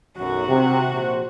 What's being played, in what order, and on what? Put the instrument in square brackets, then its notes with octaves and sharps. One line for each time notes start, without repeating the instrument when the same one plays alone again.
[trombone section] B1 F#2 [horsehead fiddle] F#4
[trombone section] C3
A#1 C5